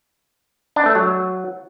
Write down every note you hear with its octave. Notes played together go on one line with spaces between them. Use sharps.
D4
A3
F#3